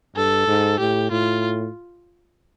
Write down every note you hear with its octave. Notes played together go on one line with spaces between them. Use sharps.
G2 A4
G#2
A2 G4
A2 F4